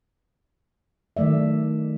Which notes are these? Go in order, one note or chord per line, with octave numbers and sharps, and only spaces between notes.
D#3 F#3 A3 D5 E5